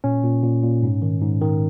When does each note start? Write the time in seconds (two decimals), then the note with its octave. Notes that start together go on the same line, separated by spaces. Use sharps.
0.04 A#2 C#4
0.23 A#2
0.43 A#2
0.63 A#2
0.83 G#2
1.02 D#3
1.22 G#2
1.42 D#3